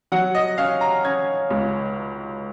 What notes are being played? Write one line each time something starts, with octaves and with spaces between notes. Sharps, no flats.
F#3 F#5
D#5
C#4 F5
A#5
C#4 G#6
C#2